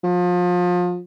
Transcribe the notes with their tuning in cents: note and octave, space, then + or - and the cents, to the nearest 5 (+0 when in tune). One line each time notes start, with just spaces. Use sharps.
F3 +30